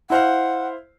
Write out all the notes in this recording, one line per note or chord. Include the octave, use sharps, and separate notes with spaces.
E4 C5 F5 F#5